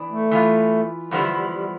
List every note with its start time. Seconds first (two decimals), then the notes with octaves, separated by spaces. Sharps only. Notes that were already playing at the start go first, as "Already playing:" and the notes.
Already playing: E3 B3 D4
0.11 A3
0.31 E3 B3 F4
1.11 E2 D3 F3 G3 B3 E4
1.31 G3
1.51 G3